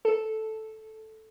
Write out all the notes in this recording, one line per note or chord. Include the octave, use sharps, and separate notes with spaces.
A4